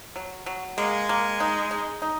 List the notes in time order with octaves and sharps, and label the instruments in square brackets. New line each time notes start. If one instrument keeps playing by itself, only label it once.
[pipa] F#3
F#3
[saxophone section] G#3 [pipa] A#3
[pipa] A#3
D#4
D#4
D#4